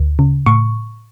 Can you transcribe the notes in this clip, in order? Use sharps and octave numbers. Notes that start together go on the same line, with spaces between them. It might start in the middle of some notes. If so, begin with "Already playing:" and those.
Already playing: D2
C#3
A2 C#6